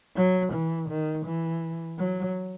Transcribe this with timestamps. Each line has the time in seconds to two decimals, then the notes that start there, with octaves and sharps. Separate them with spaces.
0.17 F#3
0.53 E3
0.89 D#3
1.26 E3
1.99 F#3